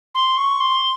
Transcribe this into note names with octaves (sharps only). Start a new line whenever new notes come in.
C6
C#6
C6